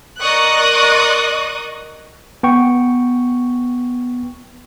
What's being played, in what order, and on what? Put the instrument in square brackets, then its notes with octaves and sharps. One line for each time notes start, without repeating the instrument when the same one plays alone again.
[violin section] A#4 D5 D#5 C#6 D#6 F#6
[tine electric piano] B3 G5 C#6